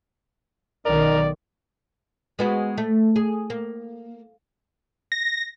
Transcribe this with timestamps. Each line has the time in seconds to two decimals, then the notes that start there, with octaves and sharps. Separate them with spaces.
0.86 B1 D#3 A#4 D5
2.39 G#3 B3 F#4
2.78 A3
3.16 G#4
3.50 A#3
5.12 A#6